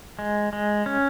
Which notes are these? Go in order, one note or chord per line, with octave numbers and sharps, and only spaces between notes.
G#3
G#3
C#4